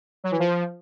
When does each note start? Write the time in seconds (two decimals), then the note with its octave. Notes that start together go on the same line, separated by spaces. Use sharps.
0.24 F#3
0.31 E3
0.39 F3